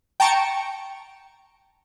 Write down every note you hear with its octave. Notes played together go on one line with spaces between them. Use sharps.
G5 A5 A#5 C#6 C#7 D7